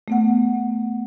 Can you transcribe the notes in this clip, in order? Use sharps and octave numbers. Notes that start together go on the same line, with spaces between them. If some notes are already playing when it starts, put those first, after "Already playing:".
A3 B3 F#5